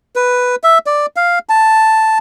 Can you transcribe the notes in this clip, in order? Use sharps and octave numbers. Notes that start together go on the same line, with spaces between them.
B4
E5
D5
F5
A5